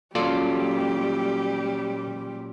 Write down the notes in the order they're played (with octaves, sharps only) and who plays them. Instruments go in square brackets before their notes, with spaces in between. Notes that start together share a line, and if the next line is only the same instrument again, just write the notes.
[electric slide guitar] A#2 F#3 C#4 [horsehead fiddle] G3 G4 [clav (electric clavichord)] F4 A4 D5